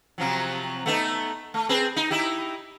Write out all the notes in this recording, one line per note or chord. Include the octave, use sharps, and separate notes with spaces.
C3 F3 F#3
A3 B3 D#4
A3
C4 G#4 B4
D#4
D#4 E4 G4